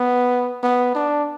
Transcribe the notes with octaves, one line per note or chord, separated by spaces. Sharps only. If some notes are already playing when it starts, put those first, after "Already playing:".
Already playing: B3
B3
D4